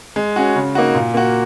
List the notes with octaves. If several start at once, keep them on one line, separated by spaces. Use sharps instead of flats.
G#3
C#4 F#4
C#3
A#3 D#4 F#4
A#2
A#3 F#4